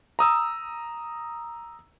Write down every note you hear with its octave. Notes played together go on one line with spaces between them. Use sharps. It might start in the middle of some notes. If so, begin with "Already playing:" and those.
A#5 D#6 E6